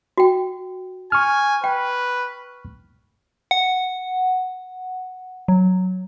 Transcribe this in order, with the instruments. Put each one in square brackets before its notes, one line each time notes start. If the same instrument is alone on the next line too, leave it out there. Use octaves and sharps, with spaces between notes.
[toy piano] F#4 G5
[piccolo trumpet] G#5 [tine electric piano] C#6 F6
[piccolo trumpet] B4 [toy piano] G5
[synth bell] F#5
F#3